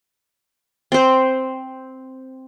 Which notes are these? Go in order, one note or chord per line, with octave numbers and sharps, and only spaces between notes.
C4 C5